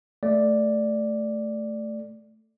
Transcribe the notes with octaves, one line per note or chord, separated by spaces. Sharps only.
A3 D5